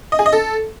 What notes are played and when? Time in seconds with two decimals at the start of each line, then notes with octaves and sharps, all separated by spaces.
0.12 D#5
0.19 G#4
0.26 D#5
0.33 A4